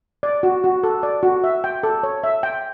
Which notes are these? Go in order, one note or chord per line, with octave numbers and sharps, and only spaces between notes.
D5
F#4
F#4
A4
D5
F#4
E5
G5
A4
C#5
E5
G5